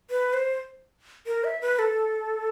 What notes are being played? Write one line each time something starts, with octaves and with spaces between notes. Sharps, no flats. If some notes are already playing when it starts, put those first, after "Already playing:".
B4
C5
A#4
E5
B4
A4